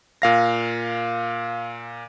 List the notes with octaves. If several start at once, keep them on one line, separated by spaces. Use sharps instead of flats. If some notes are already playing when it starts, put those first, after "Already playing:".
A#2 F5 A#6